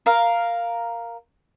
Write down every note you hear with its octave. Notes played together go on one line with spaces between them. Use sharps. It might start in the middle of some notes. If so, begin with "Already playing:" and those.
A#4 F5